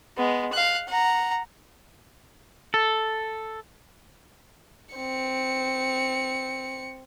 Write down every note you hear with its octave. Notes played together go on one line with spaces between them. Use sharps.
G#3 B3
F5 F#6
F#5 A#5
A4
C4 C#7